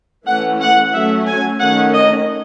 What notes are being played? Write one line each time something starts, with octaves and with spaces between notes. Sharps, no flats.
E3 A3 C#4 F#5
F#5
F#3 A3 C#4 E5
G#5
D#3 A3 C#4 F#5
D#5